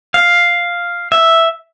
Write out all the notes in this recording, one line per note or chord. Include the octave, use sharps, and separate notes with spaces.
F5
E5